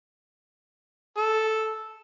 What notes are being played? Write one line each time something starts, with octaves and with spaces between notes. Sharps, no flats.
A4